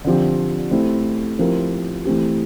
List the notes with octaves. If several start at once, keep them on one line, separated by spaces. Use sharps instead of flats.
D3 F3 C4 G4
A3 C4 E4 G4
F3 C4 E4 G4 A#4
E3 A3 C4 G4